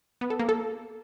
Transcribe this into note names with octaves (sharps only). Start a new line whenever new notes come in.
B3
A4
A#3
A4